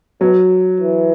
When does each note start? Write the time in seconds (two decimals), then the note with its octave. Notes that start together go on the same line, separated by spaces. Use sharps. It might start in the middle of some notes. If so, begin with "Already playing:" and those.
0.21 B2 F#3
0.81 E3